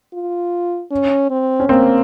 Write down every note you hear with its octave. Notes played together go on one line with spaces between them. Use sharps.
F4
C#4
C4
C#4
A#3 C4